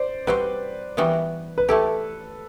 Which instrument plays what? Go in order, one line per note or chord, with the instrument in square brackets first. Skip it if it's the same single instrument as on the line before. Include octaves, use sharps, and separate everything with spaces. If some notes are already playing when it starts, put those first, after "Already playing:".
Already playing: [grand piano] C5 D5
[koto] G3 C4 F#4 C5 [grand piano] B4
[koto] E3 G3 B3 F#4
[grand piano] B4
[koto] A3 E4 G4 [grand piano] A4